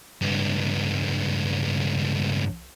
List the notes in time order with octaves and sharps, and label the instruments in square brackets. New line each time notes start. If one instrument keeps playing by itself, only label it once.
[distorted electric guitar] C#2 G2